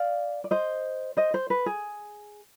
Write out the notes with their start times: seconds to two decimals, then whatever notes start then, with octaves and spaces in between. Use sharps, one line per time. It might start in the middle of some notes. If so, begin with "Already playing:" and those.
Already playing: D5 F5
0.44 D5
0.51 C5 D#5
1.17 C5 D#5
1.34 C5
1.50 B4
1.66 G#4